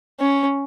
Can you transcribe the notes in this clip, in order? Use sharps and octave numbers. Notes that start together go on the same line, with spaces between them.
C#4